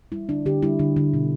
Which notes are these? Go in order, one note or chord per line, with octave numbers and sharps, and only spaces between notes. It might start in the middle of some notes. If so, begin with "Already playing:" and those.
G3 E4
D3 D4
D3 G4
G3 E4
D3
D3
B2